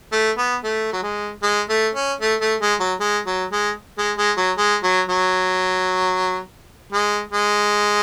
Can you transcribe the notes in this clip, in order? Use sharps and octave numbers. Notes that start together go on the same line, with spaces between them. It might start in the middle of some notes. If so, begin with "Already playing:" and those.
A3
B3
A3
F#3
G#3
G#3
A3
C#4
A3
A3
G#3
F#3
G#3
F#3
G#3
G#3
G#3
F#3
G#3
F#3
F#3
G#3
G#3